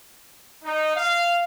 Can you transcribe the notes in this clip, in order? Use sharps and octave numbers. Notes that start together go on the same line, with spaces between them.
D#4
F5